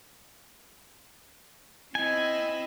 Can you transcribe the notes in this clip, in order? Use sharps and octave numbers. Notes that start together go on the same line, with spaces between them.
C4 E4 D#5 G#5